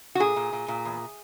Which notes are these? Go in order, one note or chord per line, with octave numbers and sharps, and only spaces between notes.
F#4
A#2 G#4
A#2
A#2
A#2
E2